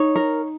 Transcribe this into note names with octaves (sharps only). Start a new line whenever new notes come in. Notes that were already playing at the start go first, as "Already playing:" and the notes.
Already playing: D#4 C#5
A#4